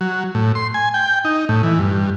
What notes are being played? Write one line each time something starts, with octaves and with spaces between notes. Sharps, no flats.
F#3
A2
C6
G#5
G5
D#4
A2
E3
G2